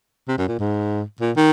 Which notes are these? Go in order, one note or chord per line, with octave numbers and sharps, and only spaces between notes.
C3
F#2
A#2
G#2
A#2
D#3